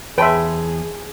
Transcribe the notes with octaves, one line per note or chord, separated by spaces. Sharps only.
E2 G#4 B4 C#5 E5 G5 A5 C6